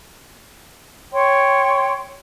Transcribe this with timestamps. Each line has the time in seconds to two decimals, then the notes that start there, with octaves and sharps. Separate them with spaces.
1.13 C#5 G5 C6